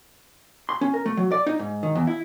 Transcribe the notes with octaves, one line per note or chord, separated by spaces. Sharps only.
C6
C#4
A#4
A3
F#3
D5
D#4
G#2
D#3
E2
E4